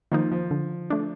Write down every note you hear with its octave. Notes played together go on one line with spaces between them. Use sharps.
D#3 F3 A#3 D#4
F3
D3
A3 D4